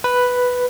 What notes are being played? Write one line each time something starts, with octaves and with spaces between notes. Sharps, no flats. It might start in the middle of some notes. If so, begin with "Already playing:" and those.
B4